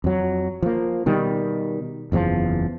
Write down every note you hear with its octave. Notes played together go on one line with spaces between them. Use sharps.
F2 F#3
F3 A#3
B2 D#3 G3
F#1 E2 A#2 F3